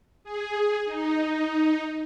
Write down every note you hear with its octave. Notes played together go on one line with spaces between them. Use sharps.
G#4
D#4